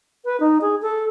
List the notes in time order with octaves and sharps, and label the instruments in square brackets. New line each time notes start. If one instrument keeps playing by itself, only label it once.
[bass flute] B4
D#4
G#4
A4